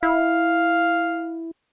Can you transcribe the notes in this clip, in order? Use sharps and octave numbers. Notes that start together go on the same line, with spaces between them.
E4 F5